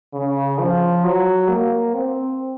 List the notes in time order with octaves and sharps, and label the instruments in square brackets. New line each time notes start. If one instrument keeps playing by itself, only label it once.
[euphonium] C#3
F3
F#3
A#3
C4